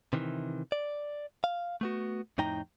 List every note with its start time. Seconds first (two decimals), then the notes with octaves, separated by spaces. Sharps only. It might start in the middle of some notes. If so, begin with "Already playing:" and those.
0.13 C3 D#3 E3
0.72 D5
1.44 F5
1.81 A3 B3 F#4
2.38 F2 A2 D#4 G5 A#5